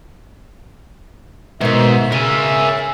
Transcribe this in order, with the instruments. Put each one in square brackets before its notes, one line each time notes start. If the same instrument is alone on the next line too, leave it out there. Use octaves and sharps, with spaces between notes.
[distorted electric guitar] G#2 [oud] B2 D#3 [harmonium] E5
[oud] C#3 [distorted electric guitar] A#4 G#5